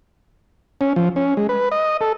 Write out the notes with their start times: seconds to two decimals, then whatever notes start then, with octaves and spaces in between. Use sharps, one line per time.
0.81 C#4
0.96 F3
1.16 C#4
1.37 G#3
1.49 B4
1.72 D#5
2.01 A4